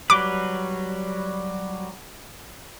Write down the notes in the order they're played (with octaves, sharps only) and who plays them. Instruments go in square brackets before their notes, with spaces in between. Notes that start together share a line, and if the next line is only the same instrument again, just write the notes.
[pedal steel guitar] F#3 G3 B4 [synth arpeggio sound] D6